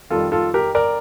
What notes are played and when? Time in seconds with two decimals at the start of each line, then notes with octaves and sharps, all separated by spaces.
0.10 F2 D#3 G3 F4 A4
0.32 F4 A4
0.54 G4 A#4
0.75 A#4 D5